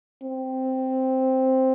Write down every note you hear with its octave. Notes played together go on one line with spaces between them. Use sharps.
C4